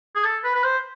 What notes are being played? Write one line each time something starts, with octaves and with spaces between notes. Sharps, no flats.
G#4
A4
B4
B4
C5